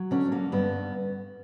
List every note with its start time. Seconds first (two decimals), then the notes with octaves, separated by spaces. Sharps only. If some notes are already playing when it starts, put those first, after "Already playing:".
Already playing: F#3
0.11 D3 C#4
0.32 A#3
0.52 G2 B3